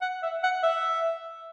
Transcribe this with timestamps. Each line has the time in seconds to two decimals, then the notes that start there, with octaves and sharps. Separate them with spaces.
0.01 F#5
0.23 E5
0.43 F#5
0.63 E5